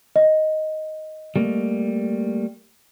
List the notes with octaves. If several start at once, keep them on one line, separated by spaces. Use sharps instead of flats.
D#5
G3 A3 A#3